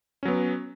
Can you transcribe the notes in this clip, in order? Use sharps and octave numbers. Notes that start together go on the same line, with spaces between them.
F#3 B3 C#4